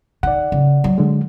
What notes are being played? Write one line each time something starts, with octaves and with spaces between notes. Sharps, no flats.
D#3 D5 F#5
C#3
F#3
D3 G#3